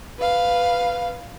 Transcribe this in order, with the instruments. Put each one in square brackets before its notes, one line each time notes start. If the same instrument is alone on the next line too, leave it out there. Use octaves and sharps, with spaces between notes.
[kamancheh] B4 F5